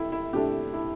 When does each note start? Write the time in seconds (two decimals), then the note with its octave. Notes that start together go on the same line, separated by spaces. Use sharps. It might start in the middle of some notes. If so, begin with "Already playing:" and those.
Already playing: C3 E4 A4
0.12 E4
0.33 C3 A3 D4 G4 A4
0.73 E4